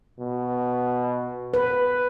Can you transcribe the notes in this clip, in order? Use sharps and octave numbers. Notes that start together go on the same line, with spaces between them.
B2
B4